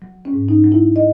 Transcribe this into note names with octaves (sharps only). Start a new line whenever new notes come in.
F#3
C#4
G#2
D#4
F#3
E4
D#5